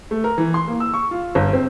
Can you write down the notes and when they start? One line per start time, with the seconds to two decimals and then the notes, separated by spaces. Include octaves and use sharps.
0.11 A3
0.24 A#4
0.38 E3
0.54 C6
0.67 A#3
0.80 E6
0.94 C#6
1.11 F4
1.35 G1
1.53 C4